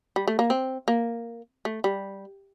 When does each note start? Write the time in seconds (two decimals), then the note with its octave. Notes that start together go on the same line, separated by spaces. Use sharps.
0.16 G3
0.28 A3
0.39 A#3
0.50 C4
0.88 A#3
1.65 A3
1.84 G3